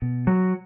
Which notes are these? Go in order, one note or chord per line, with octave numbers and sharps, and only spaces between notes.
B2
F#3